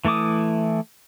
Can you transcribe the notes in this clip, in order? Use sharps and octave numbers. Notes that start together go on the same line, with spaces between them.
E3 A3 E4 D6 D#6